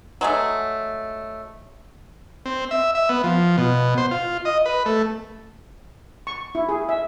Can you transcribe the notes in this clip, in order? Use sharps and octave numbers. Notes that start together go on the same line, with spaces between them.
F#3 G#3 A3
C4
E5
E5
B3
F3
B2
C5
F4
D#5
B4
A3
C#6
E4
G#4
E5